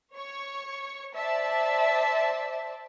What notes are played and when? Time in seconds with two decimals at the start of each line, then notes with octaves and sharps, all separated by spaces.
0.14 C#5 C#6
1.15 C5 D5 E5 A5